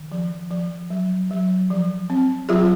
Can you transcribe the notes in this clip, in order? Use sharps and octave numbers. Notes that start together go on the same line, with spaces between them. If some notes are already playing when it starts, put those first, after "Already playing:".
Already playing: D#3
F3
F3
F#3
F#3
F3
C4
F#3 F4 G#4